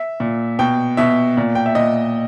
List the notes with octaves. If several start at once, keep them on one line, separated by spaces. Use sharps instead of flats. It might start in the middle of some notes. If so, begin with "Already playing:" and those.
Already playing: E5
A#2
B2 G5
B2 E5
A#2
G5
E5
A#2 D#5